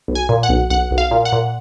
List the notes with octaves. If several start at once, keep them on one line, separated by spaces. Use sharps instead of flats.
B1
G#5
A#2
F#5
B1
B1 F#5
B1
F5
A#2
F#5
A#2